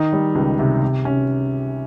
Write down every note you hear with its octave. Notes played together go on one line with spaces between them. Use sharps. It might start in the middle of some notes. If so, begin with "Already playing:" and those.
Already playing: D#3 D#4
G3
C#2
C3
C3
C3 C#4